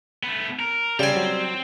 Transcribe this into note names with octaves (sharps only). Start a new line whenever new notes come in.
A3 B3
A#4
C#3 G3 C4 G#5
F#3